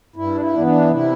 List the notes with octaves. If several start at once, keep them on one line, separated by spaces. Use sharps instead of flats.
G2 E4
D4
E4
E3 B3 D4
D4
C3 E4